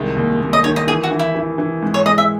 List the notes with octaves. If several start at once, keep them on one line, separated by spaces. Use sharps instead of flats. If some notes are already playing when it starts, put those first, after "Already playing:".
Already playing: C2 D#3 G#3
D#2
D#2
D#5
D#3 C#5
D#5
E3 G#4
F#4
E3
E4
E3
E3
G#2
C#5
G#3 D#5
E5